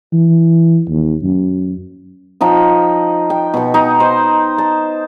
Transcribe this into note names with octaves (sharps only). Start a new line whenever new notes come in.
E3
D#2
F#2
F3 D#4 G5
G5
B2 C#6
D#4 D#5 C#6
C5
A5